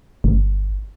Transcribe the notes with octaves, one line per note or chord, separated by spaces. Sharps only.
G1